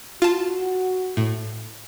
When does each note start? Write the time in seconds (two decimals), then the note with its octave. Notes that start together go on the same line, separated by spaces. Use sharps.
0.22 F4 F#4 A5
1.17 A2